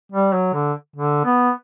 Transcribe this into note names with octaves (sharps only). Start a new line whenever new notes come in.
G3
F#3
D3
D3
B3